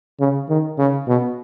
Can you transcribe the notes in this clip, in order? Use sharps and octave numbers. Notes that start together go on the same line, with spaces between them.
C#3
D#3
C#3
B2